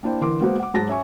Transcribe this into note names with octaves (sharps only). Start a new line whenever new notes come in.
A#3 D4 E4 C5 G5
D3 E3 A#4 C6 D6
G#3 A#3 B3 F#4 C5
F#5 D6
G#2 F#3 F#4 A5 A6 A#6
C#4 E5 G#5 C#6